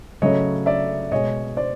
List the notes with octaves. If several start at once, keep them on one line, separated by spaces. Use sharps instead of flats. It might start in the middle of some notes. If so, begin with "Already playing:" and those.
C#3 F#3 A3 C#5 D#5
D5 E5
B2 G#3 C#5 D#5
C5 D5